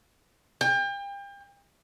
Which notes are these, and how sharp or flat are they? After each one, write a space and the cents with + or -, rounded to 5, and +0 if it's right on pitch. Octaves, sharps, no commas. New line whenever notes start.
G5 +35